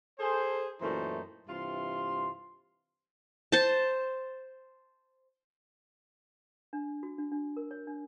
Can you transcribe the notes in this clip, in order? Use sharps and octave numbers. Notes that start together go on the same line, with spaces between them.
G#4 A4 C5
F#2 A#2 E3 A3 D#4 C5
G2 C3 E3 F4 C6
C5 A5
D4
F#4
D4
D4
A#4
C#5
D4